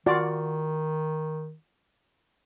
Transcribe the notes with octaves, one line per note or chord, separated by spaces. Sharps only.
D#3 F4 F#4 D5